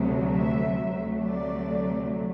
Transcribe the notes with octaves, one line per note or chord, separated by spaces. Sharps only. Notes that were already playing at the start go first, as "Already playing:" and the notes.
Already playing: D2 C3 F#3 A3
E5
D2 C3 F#3 A3
D5